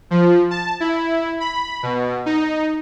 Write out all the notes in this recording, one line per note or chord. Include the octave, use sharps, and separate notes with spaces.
F3
A5
E4
B5
B2
D#4